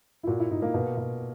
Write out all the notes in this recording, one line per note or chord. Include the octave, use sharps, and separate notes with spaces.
E4
A#2 F#4
E4
A#2 D#4
A#3
B2
B2